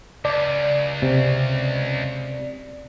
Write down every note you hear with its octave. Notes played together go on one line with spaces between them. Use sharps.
C#2 D5 A5
C3